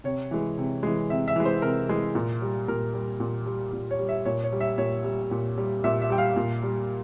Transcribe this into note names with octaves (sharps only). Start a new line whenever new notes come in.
C3 C#5
E3 G#3
C3
E3 G#3
C3 E5
E5
E3 G#3
C5
C3 A#4
E3 G#3
A#2
G3
A#2 A#4
G3
A#2
G3
A#2
C#5
G3
E5
A#2 C#5
C#5
G3
E5
A#2 C#5
G3
A#2
G3
A#2 E5
E5
G3 G5
F5
A#2
G3